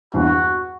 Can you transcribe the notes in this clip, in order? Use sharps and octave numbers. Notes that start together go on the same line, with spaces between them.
E2 G2 F#4